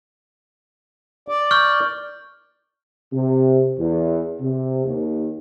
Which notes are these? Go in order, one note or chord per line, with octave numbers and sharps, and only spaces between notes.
D5
C#6 F6 G6
C3
E2
C3
D#2